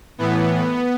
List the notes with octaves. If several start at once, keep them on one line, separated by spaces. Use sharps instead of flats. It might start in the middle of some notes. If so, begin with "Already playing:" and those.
A2 E3 B3